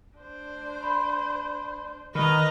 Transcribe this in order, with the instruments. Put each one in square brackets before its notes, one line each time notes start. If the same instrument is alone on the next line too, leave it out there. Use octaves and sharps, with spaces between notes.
[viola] D4 C5
[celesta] B5 C6
[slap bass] D#3 [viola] B4 [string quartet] D#5 A#5 [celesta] B5 F6